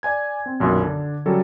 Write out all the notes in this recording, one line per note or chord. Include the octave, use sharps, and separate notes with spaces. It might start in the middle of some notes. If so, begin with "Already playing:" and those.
D5 G#5 G#6
C4
B1 F#2 A#2 D#3
D3 D4
C#3 F#3 G3 A4